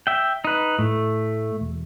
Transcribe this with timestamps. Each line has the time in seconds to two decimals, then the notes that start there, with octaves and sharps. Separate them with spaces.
0.07 E5 G5
0.45 D#4 B4
0.79 A2 A3
1.61 E1